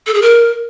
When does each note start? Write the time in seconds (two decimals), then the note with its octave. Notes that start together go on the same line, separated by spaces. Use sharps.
0.07 A4
0.14 G#4
0.22 A#4